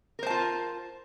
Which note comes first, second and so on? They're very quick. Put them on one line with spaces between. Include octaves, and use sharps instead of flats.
A#4 C5 A5 F4